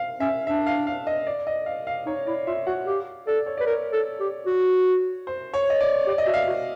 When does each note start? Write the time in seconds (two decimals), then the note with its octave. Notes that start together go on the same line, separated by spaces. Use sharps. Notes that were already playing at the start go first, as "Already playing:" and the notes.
Already playing: F5
0.20 C#4 E5
0.47 D4 E5
0.67 F5
0.87 F5
1.07 D#5
1.27 D5
1.47 D#5
1.66 F5
1.87 F5
2.06 D#4 C#5
2.27 E4 D5
2.47 F4 E5
2.67 F#4 F#5
2.86 G4 F5
3.27 A4 D5
3.46 C#5
3.58 B4 D5
3.66 A#4 C#5
3.93 A4
4.20 G4
4.47 F#4
5.27 C5
5.54 C#5
5.70 D#5
5.81 D5
6.07 G4
6.10 D5
6.18 D#5
6.26 F#4 E5
6.34 F5
6.47 F#4